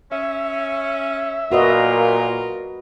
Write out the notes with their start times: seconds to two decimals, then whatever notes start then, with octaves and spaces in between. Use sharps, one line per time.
0.12 C#4 E5
1.52 A#2 F4 F#4 A#4 B4 D#5